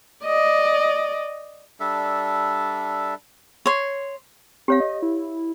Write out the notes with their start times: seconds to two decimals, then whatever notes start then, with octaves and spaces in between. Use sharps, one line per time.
0.25 D5 D#5
1.80 G3 D4 A4 E5
3.66 C#5 C6
4.68 C4 G4 C#5 F5
4.80 D#5
5.03 E4